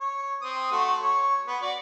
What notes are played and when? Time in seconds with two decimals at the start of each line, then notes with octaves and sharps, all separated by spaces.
0.01 C#5
0.42 C4 D#6
0.72 A3 F#4 C6
1.02 C#5
1.47 B3
1.62 F#4 D5